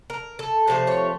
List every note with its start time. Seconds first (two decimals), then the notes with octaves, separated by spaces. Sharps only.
0.10 A#4
0.39 A4
0.67 C3 F3 A3 C5
0.87 C#5